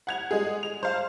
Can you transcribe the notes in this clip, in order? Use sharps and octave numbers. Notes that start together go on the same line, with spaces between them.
F#5 G#6 F7
G#3 G#4
F7
C5 F5